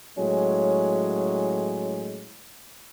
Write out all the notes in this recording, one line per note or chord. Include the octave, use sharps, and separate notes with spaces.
A2 F#3 G#3 C#4